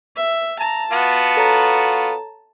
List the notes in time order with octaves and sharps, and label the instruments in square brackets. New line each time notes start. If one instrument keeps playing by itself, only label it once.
[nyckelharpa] E5
[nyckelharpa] A5 [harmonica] A#5
[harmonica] B3 F4 F#4
[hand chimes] A4 C#5 A#5